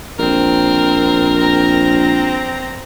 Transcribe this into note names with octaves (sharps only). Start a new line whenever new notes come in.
A#1 C4 A#4
C4 A#5